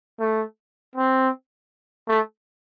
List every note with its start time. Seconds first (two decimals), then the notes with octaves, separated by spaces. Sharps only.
0.20 A3
0.95 C4
2.08 A3